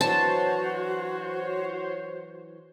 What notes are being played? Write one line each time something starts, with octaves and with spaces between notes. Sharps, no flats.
E3 F#3 D4 F#4 C5 C#5 A5